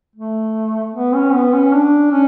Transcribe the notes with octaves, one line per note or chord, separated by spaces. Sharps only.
A3
B3
C#4
B3
C#4
D4
C#4